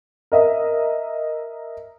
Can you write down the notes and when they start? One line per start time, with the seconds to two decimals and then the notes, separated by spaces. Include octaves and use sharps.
0.32 A#4 D#5 E5